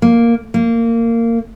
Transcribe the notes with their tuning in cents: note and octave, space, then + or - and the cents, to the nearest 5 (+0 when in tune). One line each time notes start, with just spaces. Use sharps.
A#3 +0
A#3 -20